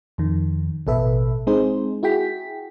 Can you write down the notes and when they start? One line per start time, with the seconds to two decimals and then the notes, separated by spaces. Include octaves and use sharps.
0.18 F2 D#3
0.87 A1 B2 A4 B4 E5
1.47 G#3 C4 D#4 G#4 C5
2.03 E4 F#4 G#4 G5 B6